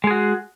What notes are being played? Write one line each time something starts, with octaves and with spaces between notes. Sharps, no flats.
G#3 F#4 G#4